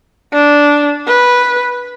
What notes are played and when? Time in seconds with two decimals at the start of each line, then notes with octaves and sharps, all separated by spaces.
0.33 D4
1.07 B4